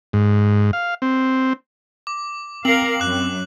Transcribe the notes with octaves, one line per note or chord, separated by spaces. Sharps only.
G#2
F5
C4
D6
C4 A#4 F5 F#7
F#2 D6 F#6